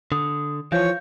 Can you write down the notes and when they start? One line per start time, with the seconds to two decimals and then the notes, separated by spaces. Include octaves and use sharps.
0.12 D3 D#6
0.72 E3 F3 C#5 F5 G6